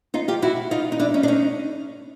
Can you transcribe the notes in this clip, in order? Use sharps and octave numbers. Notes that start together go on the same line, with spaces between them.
D#4 F4
F4 G4
E4 F#4
D#4 F4
D#4
D4 E4
C#4 D#4
D4
C#4 D#4